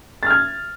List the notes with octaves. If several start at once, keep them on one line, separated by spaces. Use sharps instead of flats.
F6 G#6 A6